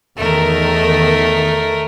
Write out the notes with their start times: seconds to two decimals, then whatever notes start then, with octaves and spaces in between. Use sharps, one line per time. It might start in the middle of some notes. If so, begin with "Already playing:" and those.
0.17 E2 D#3 A3 A#4